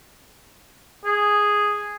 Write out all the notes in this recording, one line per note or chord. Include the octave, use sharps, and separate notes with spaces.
G#4